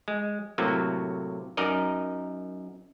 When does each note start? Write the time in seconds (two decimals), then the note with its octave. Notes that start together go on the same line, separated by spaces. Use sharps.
0.08 G#3
0.58 A2 C3 F#3 A#3
1.57 F#2 D#4 A#4 D5 D#5